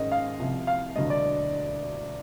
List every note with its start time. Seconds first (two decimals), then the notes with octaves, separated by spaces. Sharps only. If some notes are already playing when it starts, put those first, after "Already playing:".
Already playing: G#2 D#3 G#3 C#4 D#5
0.12 F5
0.39 C2 C3 F3
0.67 F5
0.95 E1 D2 D3 F#3 D#5
1.10 D5